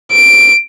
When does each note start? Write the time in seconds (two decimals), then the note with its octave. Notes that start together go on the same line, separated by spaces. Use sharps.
0.12 D7